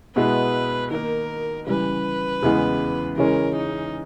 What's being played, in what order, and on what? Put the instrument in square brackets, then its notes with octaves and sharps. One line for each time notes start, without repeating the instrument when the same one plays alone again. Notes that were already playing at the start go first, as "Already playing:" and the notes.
[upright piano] B2 G#3 B3 E4 [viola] B4
[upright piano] D#3 A#3 D#4 [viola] A#4
[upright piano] C#3 E3 G3 [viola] B4
[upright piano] E2 C#3 E3 G#3 B3
[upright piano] C#3 E3 G#3 C#4 [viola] A#4
[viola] D#4